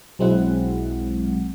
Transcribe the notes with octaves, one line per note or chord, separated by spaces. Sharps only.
B1 F#3 G#3 C4 E4 F#5